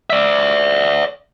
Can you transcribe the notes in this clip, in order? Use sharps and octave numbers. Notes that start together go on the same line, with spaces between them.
D5 E5